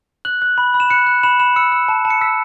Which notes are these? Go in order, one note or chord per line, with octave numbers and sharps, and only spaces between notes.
F#6 F#7
F#6
B5
B5
E7
F#6 C#7
F#6
B5 E7
B5 E7
E6 C#7
E6
A5
A5
C#7
E6 B6